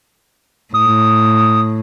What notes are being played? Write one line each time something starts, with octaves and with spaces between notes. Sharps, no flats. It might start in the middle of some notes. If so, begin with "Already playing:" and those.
A2 D#6